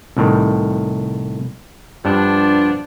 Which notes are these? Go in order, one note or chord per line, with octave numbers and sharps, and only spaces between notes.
C2 A2 D#3
G2 F3 B3 D4